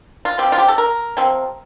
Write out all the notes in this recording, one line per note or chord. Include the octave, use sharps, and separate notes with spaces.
F4
F3 C4 G4
F4
G4
A4
A#4
C3 F3 C4